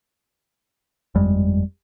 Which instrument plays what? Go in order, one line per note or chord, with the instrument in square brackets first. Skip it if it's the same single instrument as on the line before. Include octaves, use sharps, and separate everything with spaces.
[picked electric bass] G1 F2 G3 G#3